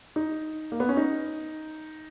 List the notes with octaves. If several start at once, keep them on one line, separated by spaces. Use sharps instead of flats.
D#4
A#3
B3
C#4
D#4